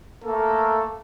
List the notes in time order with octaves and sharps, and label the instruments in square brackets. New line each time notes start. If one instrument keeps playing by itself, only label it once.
[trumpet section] A3 A#3 A#4 [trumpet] A4